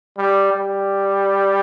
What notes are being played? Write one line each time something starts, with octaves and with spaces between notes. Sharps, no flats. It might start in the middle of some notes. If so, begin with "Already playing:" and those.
G3
G3